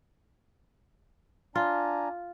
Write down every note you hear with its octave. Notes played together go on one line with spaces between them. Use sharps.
D4 F4 G#5 A#5